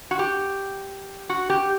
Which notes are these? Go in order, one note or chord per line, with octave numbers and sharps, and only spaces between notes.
F#4
G4
F#4
G4